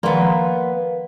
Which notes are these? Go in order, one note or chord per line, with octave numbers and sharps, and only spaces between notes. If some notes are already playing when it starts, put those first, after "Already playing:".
D#3 F3 A#3 B3 C6